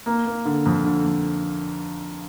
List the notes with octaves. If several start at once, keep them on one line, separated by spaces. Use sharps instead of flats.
A#3
A#3
D3
F2
D3
F2